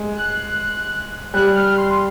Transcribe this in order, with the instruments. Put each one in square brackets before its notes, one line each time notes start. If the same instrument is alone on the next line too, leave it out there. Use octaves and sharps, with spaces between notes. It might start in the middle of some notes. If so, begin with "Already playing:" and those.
Already playing: [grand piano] G#3
[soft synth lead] F#6
[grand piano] G3 [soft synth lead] F#6
[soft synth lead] F6
C6